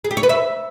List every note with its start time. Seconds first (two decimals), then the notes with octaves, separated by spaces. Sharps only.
0.04 G#4
0.11 G4
0.17 C#5
0.23 B4
0.29 E5